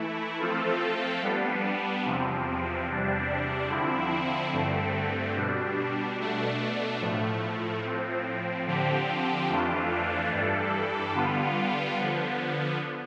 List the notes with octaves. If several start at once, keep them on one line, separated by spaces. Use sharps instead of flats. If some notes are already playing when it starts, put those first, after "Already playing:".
Already playing: E3 A3 E4
F3 A3 C4 F4 A4
G3 B3 D4
E2 C3 F3 C4
E2 C3 G3 D4
D3 F3 C4 E4
G2 D3 A3 C4
B2 G3 D4
B2 A3 D4
A2 F3 A3
A2 F3 C4
D3 F3 C4 G4
F2 E3 A3 D4 F4
G2 E3 G3 D4 A4
D3 G3 B3 F4
D3 F3 B3